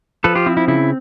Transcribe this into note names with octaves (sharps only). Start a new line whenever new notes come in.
F3 A4 B4
F4 G4
C4 E4
E4
C#3 E4